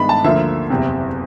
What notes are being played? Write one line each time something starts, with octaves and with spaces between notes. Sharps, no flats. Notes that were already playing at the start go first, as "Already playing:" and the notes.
Already playing: G2 D#3 G#3 B3 D4 B5
A5
D2 D3 F3 A#3 E5
F#1 E2 C3